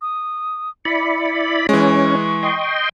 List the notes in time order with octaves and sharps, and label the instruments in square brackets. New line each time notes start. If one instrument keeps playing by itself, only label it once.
[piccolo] D#6
[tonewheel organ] E4 D5 B5 [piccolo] C#7
[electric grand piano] E3 G#3 [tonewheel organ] C#4 [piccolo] C#6
[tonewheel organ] D#5 G5 C6